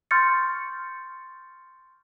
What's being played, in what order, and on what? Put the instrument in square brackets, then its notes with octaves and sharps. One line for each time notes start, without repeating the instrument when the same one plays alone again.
[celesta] C6 C#6 F6 G6 A6 C#7